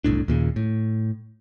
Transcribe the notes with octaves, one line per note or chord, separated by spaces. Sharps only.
F#1 C2 A2 D4
D#2 A#2 C#3
A2